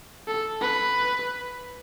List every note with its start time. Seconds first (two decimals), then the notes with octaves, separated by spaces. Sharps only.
0.27 A4
0.61 B4